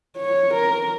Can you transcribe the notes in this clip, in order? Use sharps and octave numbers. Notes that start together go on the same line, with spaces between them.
C#5
A#4